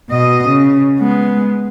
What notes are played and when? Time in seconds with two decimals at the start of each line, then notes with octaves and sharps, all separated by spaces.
0.10 B2 D#5
0.48 C#3
1.00 G#3 B3